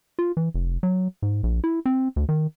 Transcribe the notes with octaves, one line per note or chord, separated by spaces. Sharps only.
F4
E3
F1
F#3
G#2
A#1
E4
C4
D2
D#3